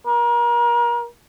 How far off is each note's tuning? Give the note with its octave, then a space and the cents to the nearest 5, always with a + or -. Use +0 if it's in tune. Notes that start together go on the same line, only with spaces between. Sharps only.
A#4 +35